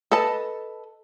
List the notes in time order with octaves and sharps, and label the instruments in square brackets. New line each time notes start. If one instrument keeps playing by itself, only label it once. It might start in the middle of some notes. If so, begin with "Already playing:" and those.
[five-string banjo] A4 B4 D#5 A5